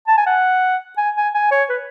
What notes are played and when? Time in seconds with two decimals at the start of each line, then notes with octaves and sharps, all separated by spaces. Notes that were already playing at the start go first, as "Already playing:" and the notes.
0.08 A5
0.17 G#5
0.26 F#5
0.98 G#5
1.16 G#5
1.34 G#5
1.51 C#5
1.69 B4